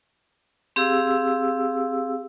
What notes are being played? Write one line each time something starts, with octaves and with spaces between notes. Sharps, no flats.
C4 G4 G#4 F5 E6